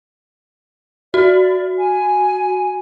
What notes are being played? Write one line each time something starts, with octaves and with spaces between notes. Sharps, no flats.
F#4 D5
G#5